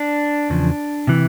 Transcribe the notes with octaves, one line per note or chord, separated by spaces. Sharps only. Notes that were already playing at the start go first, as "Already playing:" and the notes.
Already playing: D4
E2 C#3 F3
C3 E3